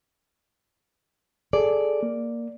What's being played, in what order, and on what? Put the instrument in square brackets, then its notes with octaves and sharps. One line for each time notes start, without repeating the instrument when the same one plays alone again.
[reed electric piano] G#4 A4 [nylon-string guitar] D5
[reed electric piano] A#3